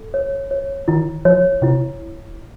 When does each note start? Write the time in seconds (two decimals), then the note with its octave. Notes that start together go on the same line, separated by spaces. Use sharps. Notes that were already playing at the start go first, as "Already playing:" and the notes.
Already playing: A4
0.14 C#5
0.51 C#5
0.88 D#3 E4
1.25 F3 C#5
1.62 C3 E4